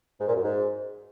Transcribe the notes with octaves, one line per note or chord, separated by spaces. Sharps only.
G#2
A#2
F#2
G#2